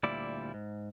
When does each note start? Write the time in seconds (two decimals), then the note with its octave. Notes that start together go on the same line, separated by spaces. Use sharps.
0.03 D2 A#2 G3 E4 D5
0.54 G#2